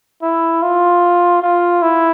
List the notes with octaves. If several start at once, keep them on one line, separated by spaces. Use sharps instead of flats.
E4
F4
F4
E4